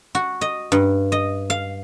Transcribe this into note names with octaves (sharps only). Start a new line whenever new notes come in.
F#4
D#5
G2
D#5
F5